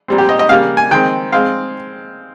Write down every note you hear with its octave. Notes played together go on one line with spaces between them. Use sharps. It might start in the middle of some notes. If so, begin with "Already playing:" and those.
A#2 G3 C4
G4
D#5
D#5
C#3 G3 A#3 F5
G#5
D#3 G#3 C4 G5
G#3 C4 F5